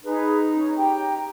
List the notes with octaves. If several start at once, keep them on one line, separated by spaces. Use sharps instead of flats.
D#4 G#4 B4
C#4
G4 G5 A#5